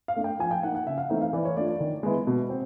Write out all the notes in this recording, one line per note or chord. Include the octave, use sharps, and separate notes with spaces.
F5
A3 D4
G5
F3 G#5
G5
A#3 D#4 F#5
F#5
C#3 E5
F5
E3 A3 C4 D#4 E5
F5
E3 D5
C#5
A3 D4 F4 D5
D5
D#3
G#3 B3 E4
B2
C4